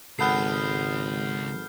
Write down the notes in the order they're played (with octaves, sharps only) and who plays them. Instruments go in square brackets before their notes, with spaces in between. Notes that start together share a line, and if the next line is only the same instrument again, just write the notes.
[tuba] G#1 [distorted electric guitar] C#2 [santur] B3 A4 [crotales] F6 G6 C7